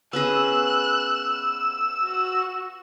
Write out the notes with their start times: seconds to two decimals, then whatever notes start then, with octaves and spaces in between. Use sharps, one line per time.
0.13 B3 C#4 G#4 E6 F#6
2.03 F#4